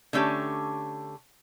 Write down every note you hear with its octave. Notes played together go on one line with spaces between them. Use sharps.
D3 A3 C#4 G4